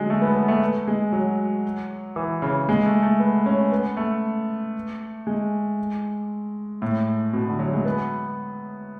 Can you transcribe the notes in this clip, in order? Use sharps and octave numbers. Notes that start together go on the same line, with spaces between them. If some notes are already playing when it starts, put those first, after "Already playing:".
Already playing: D3 F#3 G#3
A3
B3
B3
A3
G#3
F#3
E3
C#3
G#3
A3
A3
B3
C#4
B3
A3
G#3
A2
B2
D3
F#3
G#3
B3